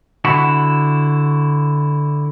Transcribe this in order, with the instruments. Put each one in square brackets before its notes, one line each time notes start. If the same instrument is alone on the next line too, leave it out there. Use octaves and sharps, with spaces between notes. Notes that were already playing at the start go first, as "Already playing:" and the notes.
[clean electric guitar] D3 E4 F#4